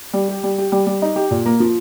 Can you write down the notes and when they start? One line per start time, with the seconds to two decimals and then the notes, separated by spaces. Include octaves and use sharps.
0.13 G3
0.28 G4
0.43 G3
0.58 G4
0.72 G3
0.87 G3
1.02 D#4
1.16 G4
1.31 A#2
1.46 A#3
1.60 F3